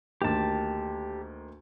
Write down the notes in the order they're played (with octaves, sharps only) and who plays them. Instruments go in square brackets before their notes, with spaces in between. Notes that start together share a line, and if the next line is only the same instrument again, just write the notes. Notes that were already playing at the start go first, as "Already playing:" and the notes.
[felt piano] D2 D#3 A#3 [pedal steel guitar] G4 A5